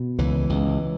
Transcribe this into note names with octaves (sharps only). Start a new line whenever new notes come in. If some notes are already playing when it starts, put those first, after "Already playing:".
Already playing: B2
C#2 E3
C#2